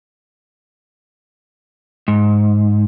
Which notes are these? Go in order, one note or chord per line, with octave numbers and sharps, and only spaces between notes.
G#2